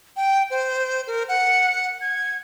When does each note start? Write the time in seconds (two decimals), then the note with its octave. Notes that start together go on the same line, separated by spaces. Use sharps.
0.16 G5
0.50 C5
1.07 A#4
1.29 F#5
2.01 G#6